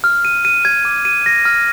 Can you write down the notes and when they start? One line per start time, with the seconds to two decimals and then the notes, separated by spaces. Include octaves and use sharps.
0.04 F6
0.25 D#7
0.45 D#7
0.65 G#6
0.85 D6
1.05 D#7
1.26 A#6
1.45 F6